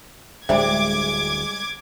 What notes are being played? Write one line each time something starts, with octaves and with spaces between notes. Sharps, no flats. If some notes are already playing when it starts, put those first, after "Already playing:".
D1 G3 G#3 D4 C5 E5 D6 G#6